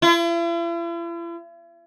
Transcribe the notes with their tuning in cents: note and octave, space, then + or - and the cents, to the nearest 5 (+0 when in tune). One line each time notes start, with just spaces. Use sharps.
E4 +45